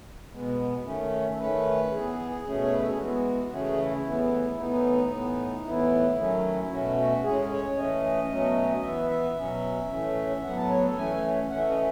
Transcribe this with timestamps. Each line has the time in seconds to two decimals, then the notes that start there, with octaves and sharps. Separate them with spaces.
0.32 B2 G#3 B3
0.84 D#3 A3 C#4
1.33 A4
1.38 D#3 A3 C#4 B4
1.91 E3 B3 G#4
2.45 B2 A3 C#4
2.64 C#5
2.72 B4
2.80 A4
2.89 G#4
2.98 E3 G#3 B3 F#4
3.51 C#3 E3 A3 C#4 G#4
3.78 E4
4.05 A2 E3 G#3 B3
4.57 A2 E3 B3 D#4
5.10 A2 E3 B3
5.64 A2 E3 B3 E4
6.17 D#3 F#3 A3 C#4
6.70 B2 A3 C#4 F#4
6.97 F#4
7.23 A2 G#3 C#4 G#4
7.51 C#5
7.77 E3 A3 C#4 D#5
8.30 B2 F#3 A3 C#4
8.83 E3 B3 E5
9.10 E5
9.36 B2 F#3 C#4
9.90 A2 E3 A3 C#4
10.43 A2 F#3 B3 F#5
10.56 A5
10.70 C#5
10.83 A4
10.97 E3 A3 C#4 G#5
11.50 E3 A3 C#4 F#5
11.59 E5
11.69 D#5